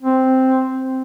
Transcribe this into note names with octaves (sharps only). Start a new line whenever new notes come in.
C4